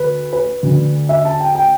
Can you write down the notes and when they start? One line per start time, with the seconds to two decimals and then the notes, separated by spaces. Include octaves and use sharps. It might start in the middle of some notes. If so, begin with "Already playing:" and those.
Already playing: D2 B4
0.33 B4
0.63 D2 D3
1.09 E5
1.25 A5
1.40 G5
1.55 G5